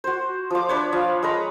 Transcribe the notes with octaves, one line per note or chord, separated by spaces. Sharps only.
F#4 C5
F3 D6
D4 B4 C#5 E5
F3 F5
G#3 B4 A#5 B5